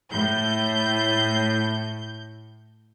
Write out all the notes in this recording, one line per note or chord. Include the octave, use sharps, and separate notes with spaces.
A2 G6